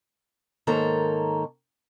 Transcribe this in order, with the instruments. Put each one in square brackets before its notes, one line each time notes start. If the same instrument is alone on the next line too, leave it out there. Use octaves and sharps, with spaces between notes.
[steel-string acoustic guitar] G#2 D#3 A#3 A4 C#5 A#5